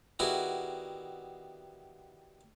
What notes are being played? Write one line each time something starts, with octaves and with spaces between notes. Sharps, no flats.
D#3 G3 B3 E4 F#4 G#4